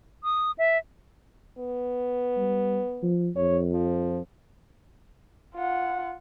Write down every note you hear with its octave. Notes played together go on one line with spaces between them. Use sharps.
D#6
E5
B3
G3
F3
F2 C#5
F3
F4 F#5